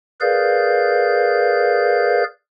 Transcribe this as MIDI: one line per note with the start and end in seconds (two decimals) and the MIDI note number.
0.21 2.24 68
0.21 2.24 70
0.21 2.24 71
0.21 2.24 74
0.21 2.24 77
0.21 2.24 91